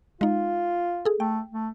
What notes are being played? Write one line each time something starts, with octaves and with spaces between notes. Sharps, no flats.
G#3 D#4 F4
G#4 A4
A3 G5
A3